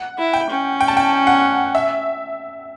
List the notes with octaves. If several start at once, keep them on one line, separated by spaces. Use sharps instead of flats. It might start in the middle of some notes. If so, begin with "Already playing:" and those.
Already playing: F#5
E4
G5
C#4
G5
A5
G5
F#5
E5